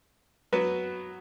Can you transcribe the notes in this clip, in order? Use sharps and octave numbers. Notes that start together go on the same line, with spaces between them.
F#3 B3 F#4 B4